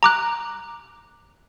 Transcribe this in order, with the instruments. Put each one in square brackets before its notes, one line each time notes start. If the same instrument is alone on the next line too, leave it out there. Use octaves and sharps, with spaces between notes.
[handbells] A#5 D6 F#6